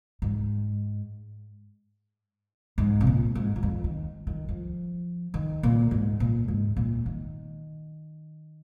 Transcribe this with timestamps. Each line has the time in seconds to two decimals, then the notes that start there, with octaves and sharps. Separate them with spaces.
0.22 G#2
2.78 G#2
3.01 C3
3.07 A#2
3.35 G#2
3.56 G#2
3.63 F2
3.84 D#3
4.27 D#3
4.49 F3
5.34 D#3
5.63 A#2
5.91 G#2
6.20 A#2
6.48 G#2
6.77 A#2
7.06 D#3